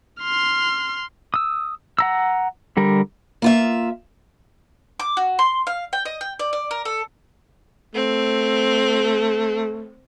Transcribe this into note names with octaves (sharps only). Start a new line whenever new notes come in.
C6 F6
D#6 E6
F#5 A#5 E6
D3 G3 A#4
A#3 F4 E5
D6
F#4
C6
F5
G5
D#5
G5
D5
D5
A#4
A4
A3 C4